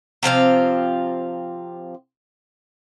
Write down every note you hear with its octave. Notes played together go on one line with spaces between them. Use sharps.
C3 F3 C4 F4